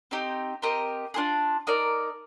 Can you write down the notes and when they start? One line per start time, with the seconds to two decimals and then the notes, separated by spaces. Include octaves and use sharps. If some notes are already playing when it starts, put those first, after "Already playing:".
0.11 C4 D#4 G4
0.62 C4 G4 A#4 D#5
1.14 D4 F4 G#4
1.67 D#4 A#4 D5